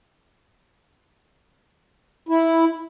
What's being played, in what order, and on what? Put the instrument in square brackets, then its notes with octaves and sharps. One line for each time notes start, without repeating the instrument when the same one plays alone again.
[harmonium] E4